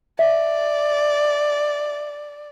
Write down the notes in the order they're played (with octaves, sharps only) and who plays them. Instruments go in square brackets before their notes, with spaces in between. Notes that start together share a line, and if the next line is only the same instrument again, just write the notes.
[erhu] D5 [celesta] E5